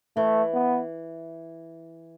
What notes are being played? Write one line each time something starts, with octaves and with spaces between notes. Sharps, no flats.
E3 A3
B3